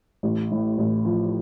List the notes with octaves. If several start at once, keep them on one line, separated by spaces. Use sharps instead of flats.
A1
A2
A1
F3